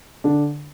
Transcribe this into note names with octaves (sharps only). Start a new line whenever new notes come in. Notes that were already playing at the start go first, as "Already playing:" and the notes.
D3 D4